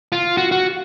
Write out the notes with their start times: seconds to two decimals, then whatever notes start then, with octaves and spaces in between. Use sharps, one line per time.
0.12 F4
0.37 F#4
0.51 F#4